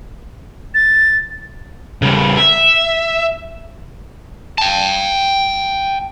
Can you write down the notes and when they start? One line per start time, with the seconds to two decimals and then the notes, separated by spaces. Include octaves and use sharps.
0.74 A6
2.02 C#3 G3
2.37 E5
4.58 G5 A5